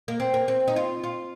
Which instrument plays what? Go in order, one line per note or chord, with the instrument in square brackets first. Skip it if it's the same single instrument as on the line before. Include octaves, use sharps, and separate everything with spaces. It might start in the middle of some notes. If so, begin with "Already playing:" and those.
[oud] A#3
C4
A#3
C4
D#4
F4
F4